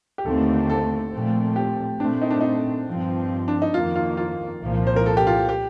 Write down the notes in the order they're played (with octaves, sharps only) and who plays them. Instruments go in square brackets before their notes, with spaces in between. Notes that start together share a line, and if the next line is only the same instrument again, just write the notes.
[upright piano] G4
[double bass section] D#2 D3 A3 C4 [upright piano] A4
[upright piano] A4
[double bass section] A#2 F3 A3 C4
[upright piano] G4
[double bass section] A#2 A3 C4 [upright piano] D4
[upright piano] D#4
D4
D#4
[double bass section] G2 F3 C4
[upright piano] D4
D#4
[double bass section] F2 D#3 A#3 [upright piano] F4
[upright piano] F4
F4
[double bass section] C2 A#2 F3 A#3
[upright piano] C5
A#4
A4
G4
F4
G4